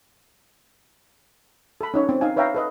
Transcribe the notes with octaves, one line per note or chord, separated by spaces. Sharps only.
A4 B5
C#4 D#4 C#5
C4
D#4 F5 G#5
B4 C#5 E5 F5 G5 A#5
A4 B4 D#5